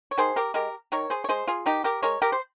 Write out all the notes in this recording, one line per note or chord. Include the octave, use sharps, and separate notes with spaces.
C#5
D#3 G#4 C5
G4 A#4
G#3 G4 A#4
D#3 A#4 C#5
G#4 C5
C#5
G#3 G#4 C5
F4 G#4
D#3 D#4 G4
G4 A#4
G#3 A#4 C#5
G4 A#4
C5